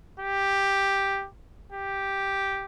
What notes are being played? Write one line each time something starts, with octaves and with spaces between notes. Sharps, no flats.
G4
G4